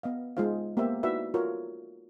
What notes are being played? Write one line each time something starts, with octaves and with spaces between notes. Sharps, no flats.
B3 D#5 F5
G#3 D#4 F4 C5 F5
A#3 B3 G4 A#4 C5 E5
D#4 E4 F#4 B4 D5 E5
F4 F#4 A4 A#4 C#5